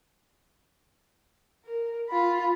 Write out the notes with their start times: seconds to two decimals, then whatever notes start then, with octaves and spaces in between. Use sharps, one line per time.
1.65 A#4
2.09 F4 B5